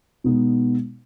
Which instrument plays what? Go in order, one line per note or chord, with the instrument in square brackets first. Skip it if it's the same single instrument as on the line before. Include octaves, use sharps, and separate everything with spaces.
[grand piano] B2 G#3 B3 D#4